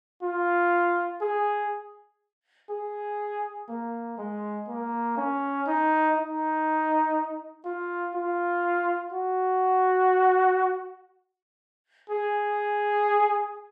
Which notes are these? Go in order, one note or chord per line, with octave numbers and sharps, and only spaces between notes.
F4
G#4
G#4
A#3
G#3
A#3
C#4
D#4
D#4
F4
F4
F#4
G#4